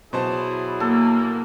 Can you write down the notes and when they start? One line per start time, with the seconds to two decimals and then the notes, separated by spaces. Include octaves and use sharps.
0.13 B2 F#3 E4 G#4 C5 A5
0.80 A#3 A4